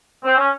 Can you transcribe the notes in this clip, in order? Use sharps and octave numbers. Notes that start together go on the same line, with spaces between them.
C4
C#4